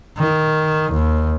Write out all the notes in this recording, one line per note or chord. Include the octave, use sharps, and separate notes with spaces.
D#3
D#2